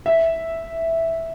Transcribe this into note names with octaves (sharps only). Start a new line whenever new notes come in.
E5